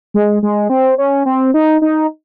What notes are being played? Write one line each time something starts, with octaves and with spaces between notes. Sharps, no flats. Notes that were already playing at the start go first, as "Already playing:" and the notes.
G#3
G#3
C4
C#4
C4
D#4
D#4